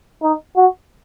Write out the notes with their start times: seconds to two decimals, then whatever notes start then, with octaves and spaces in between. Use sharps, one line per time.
0.23 D#4
0.56 F#4